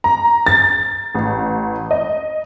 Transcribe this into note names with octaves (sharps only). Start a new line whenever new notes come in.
A#5
A6
A1
D#5